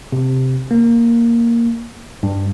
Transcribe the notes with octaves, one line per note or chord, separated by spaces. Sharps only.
C3
A#3
G2